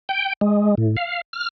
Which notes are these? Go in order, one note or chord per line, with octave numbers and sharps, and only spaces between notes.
G5
G#3
A2
F5
F6